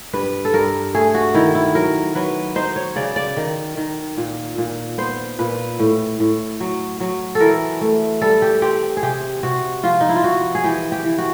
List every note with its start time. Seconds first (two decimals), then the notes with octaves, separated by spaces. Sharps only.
0.13 G2 B4
0.45 A4
0.54 G2 A#4
0.94 A3 G#4
1.14 F#4
1.34 D#3 E4
1.55 E4
1.75 F#3 A#4
2.15 F#3 B4
2.55 D#4 C5
2.76 C#5
2.96 C#3 D5
3.16 D5
3.37 D#3
3.77 D#3
4.17 A#2
4.58 A#2
4.98 B3 C5
5.39 A#2 B4
5.79 A2
6.20 A2
6.60 F#3
7.00 F#3
7.35 A4
7.40 E3 A#4
7.81 A3
8.21 G3 A4
8.42 G4
8.62 C4 G4
8.97 G#4
9.03 C3 G4
9.43 C3 F#4
9.83 F3 F4
10.01 D#4
10.09 E4
10.16 F4
10.24 F3 F#4
10.55 G#4
10.64 E3 G4
10.92 G4
11.05 E3
11.18 F#4